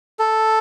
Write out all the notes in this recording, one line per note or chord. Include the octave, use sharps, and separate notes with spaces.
A4